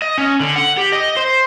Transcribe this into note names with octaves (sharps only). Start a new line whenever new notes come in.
D#5
C#4
D3
F#5
G4
D#5
C5